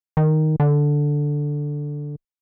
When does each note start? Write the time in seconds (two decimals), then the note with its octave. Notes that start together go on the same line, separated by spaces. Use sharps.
0.17 D#3
0.60 D3